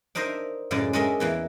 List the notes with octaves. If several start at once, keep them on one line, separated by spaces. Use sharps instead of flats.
D4 D#4 A#4 C5 D#5 E5
F#2 A2 C#3 G#3 D5
G#3 D4 A#4 C#5 D#5 E5
E2 E3 A#3